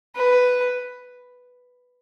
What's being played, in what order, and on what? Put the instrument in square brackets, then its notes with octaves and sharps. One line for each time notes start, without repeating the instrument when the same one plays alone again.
[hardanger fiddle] B4